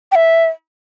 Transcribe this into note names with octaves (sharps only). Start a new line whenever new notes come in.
G5
E5